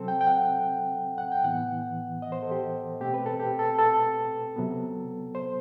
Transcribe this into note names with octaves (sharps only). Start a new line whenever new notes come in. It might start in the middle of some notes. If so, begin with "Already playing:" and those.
Already playing: C3 F#3 C4 A4
G5
G5
F#5
F#5
G5
A2 E3 B3 F#5
D#5
C5
A4
G4
B2 A3 C4 G4
B4
A4
G4
A4
A4
C3 F#3 B3
C5